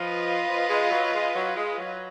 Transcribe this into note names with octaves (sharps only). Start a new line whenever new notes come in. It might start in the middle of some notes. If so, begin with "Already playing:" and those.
Already playing: F3 F4 B4 D#5
F3
G#3
F#3
G#3
F#3
G#3
F#3